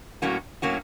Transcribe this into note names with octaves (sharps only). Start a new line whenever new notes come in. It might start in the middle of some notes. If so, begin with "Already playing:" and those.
A2 F#3 A#3 C#4 F#4
A2 F#3 A#3 C#4 F#4